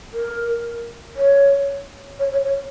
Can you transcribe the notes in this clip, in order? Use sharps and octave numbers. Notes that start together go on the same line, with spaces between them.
A#4
C#5
C#5
C#5
C#5